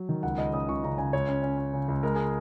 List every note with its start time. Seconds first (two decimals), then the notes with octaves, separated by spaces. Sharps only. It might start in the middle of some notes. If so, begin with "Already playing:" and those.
Already playing: F#3
0.09 D#3
0.23 C#2 F#5
0.38 C#2 D#5
0.53 C#3 D#6
0.68 C#2 C#6
0.84 C#3 A#5
0.98 C#3 G#5
1.13 C#2 C#5
1.28 C#4
1.43 C#4
1.58 C#4
1.74 C#3
1.88 C#2
2.03 G#3 A#4
2.15 G#4